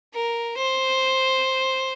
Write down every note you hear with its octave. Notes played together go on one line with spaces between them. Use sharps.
A#4
C5